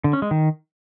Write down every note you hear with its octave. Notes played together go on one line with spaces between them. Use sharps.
D3
C#4
G#3
D#3